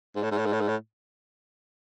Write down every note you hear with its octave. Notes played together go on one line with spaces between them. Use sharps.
G#2
A2
G#2
A2
G#2
A2
G#2
A2